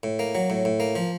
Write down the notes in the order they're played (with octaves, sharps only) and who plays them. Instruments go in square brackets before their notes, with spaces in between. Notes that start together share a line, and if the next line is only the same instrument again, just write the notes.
[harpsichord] A2
A#3
F#3
A2
A2
A#3
F3